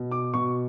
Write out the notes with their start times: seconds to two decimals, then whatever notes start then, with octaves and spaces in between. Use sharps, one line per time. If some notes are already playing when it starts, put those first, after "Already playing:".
Already playing: B2
0.11 D6
0.34 B2 C#6